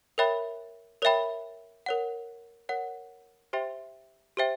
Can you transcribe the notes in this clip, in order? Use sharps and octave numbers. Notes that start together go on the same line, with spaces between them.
A#4 C#5 E5 G5 B5
A#4 C#5 E5 G5 B5
A#4 C#5 F#5
A#4 C#5 F#5
G4 C5 E5 G5 C6
G4 C5 E5 G5